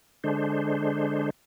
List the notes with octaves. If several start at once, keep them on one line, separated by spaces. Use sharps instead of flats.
D3 G#3 D4 C5